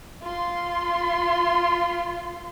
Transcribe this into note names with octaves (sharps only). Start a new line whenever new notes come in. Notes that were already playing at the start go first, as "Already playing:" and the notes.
F4 C6